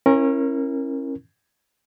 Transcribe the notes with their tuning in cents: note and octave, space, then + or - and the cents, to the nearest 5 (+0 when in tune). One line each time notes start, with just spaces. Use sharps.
C#4 -30 E4 +0 A#4 +0